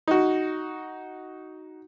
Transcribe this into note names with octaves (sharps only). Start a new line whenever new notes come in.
D#4 F#4